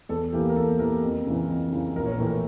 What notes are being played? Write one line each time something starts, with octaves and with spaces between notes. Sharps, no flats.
E2 A4
E3 A#3 G4
A#4
E2 A4
E3 A#3 A#4
F2
C#3 E3
F2
C#3 E3
A#1 A#4
C#5
A#4
A2 E3 A3
A#4